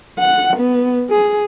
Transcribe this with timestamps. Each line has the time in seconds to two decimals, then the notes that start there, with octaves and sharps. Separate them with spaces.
0.19 F#5
0.57 B3
1.11 G#4